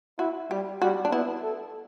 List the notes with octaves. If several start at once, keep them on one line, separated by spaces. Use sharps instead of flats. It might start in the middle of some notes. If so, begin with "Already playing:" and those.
E4 F#4
G3 G4
G3 F#4
D4
B3 E4
A4